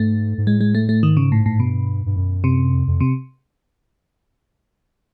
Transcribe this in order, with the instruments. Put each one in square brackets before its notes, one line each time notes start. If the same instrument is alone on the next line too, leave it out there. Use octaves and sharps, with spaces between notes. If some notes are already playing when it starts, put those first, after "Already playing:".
Already playing: [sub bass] G#2 [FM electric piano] A3
[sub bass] G#2
[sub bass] A2 [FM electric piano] G#3
[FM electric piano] G#3
A3
A3
[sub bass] G#2 [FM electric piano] D#3
[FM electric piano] C#3
A2
A2
[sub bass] G2 [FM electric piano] B2
[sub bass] G2
F#2
[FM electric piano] C3
[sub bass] F2
F2
[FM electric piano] C3